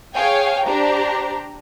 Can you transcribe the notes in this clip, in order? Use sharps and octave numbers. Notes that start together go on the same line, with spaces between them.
G#4 C#5 F5 G5 G#5
D4 G4 C5 A#5